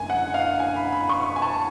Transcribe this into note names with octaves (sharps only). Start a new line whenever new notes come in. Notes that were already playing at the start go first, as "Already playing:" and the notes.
Already playing: F#1 D3 G#3 G#5
F#5
F5
G#5
B5
B5
C#6
C#6
G#5
A5